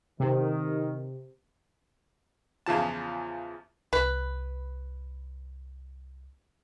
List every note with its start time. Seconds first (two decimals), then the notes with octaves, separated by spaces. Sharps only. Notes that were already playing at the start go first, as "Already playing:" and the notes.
0.20 C3 D#3
2.66 E2 C#3 F3 A5
3.93 C2 B4